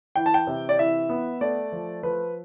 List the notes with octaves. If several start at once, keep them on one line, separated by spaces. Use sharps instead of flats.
E3 G5
A5
G5
C3
D5
E3 E5
B3
A3 D5
F3
F3 B4